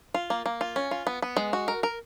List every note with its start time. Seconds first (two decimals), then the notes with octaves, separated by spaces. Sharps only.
0.14 F4
0.30 A#3
0.46 A#3
0.61 F4
0.76 C#4
0.91 F4
1.07 B3
1.22 B3
1.37 G#3
1.53 F#4
1.68 A#4
1.83 A#4